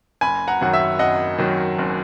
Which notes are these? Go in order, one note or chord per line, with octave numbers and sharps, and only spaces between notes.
F#1 G#5 B5
F#5 A#5
F#2 D#3 F#3 F#5
E5
F#1 D#5 F#5
F#2 D#3 F#3
F#1